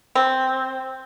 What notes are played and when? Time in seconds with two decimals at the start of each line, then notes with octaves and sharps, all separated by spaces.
0.15 C4